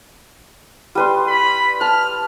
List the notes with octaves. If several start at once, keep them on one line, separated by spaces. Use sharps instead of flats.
G3 B4 C6
B5
A5 F6